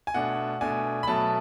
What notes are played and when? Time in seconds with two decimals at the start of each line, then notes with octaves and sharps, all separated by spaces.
0.07 G#5
0.14 B2 A3 D4 F#5
0.61 B2 A3 D4 G#5
1.03 B5
1.07 B2 F#3 A3 A5